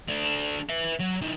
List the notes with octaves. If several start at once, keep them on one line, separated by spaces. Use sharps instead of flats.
A3 D4
B4 E5
F#3
E3 D#4